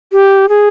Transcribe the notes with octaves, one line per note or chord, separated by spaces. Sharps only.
G4
G#4